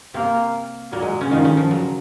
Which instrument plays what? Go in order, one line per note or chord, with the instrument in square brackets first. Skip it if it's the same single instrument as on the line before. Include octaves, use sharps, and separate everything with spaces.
[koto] C3 C4 [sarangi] A#3
[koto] A#2 A#3 [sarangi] F#3
[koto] G#3
C#3 C#4
[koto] D#3 D#4 [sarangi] F3
[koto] C#3 C#4
F3
F#3